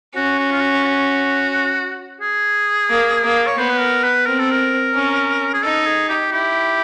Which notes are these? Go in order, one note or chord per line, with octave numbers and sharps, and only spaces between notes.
C#4 F#4
F#4
F4
F#4
F#4
G#4
A#3
A#3
C#5
B3 C5
B4
A#4
B4
C4 A#4
A4
A#4
C#4
G#4
D#4 A4
G#4
G4
E4 G4